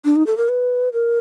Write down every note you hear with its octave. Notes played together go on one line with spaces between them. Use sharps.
D4
D#4
A4
A#4
B4
A#4